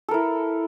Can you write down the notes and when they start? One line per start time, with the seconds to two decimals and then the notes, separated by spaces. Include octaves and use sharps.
0.09 A4
0.11 A#4
0.14 E4